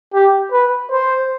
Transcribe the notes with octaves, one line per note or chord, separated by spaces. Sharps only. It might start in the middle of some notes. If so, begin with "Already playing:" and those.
G4
B4
C5